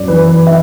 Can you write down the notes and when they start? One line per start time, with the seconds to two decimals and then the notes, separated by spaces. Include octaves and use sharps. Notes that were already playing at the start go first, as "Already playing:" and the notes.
Already playing: F#2 D5
0.08 E3 B4
0.28 B4
0.47 E5